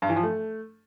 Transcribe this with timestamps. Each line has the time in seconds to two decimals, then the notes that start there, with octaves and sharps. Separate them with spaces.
0.02 G2
0.09 E3
0.16 F3
0.23 A3